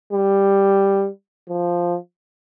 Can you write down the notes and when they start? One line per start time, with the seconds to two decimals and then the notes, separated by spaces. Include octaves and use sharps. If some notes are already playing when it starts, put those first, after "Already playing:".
0.13 G3
1.49 F3